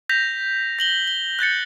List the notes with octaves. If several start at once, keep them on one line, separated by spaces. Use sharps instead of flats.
G6 A#6 B6 F7
A#6 F#7 G7
G7
F#6 G6 A6 C#7